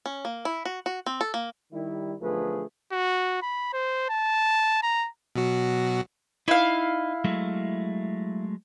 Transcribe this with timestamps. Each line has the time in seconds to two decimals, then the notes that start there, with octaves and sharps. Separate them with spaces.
0.06 C#4
0.25 A#3
0.45 E4
0.65 F#4
0.86 F#4
1.06 C4
1.21 A4
1.34 A#3
1.72 D#3 G3 E4
2.20 B1 D3 F3 A3 G#4 B4
2.92 F#4
3.42 B5
3.73 C5
4.10 A5
4.83 A#5
5.35 B2 F#3 F#4
6.48 D#4 E4 F5
7.24 F#3 G#3 A3